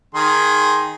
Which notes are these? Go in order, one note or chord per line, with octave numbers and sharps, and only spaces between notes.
D#3 G#4 C6